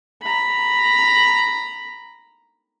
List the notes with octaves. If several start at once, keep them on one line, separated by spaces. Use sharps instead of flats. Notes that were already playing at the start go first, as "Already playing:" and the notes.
A#5 B5